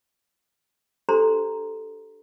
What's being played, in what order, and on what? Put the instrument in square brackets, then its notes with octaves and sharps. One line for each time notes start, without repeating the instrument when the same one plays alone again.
[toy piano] D4 G4 A4 C5 A#5 C6